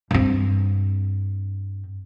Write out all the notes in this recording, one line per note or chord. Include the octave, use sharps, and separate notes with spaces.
G2 C4